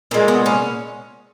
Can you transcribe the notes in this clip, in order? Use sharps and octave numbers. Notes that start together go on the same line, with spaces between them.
A#2 G#3 A#3
B3
C#4